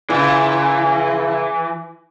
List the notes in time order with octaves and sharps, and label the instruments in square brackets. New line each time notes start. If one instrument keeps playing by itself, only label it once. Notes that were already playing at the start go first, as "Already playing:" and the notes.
[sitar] A#2 C#3 [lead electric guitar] E3